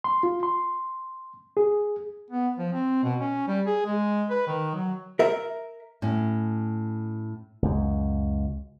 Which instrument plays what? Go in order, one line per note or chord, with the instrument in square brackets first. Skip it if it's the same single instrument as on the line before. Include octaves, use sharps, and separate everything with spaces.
[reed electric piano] C6
F4
C6
G#4
[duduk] B3
F3
C4
B2
C#4
G3
G#4
G#3
B4
D#3
F#3
[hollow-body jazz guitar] A#4 E5
[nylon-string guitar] A2 C#4
[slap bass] C#2 F#2